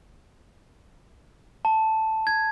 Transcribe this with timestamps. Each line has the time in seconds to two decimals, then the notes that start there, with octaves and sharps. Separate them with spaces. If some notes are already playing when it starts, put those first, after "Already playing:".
1.65 A5
2.27 G#6